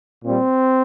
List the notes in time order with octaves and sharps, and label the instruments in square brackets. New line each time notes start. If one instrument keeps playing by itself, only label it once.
[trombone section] A#2 G3 C4